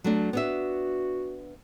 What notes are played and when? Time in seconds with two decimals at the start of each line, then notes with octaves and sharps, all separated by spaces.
0.04 F#3 A3 D4
0.33 B3 D4 F#4 E5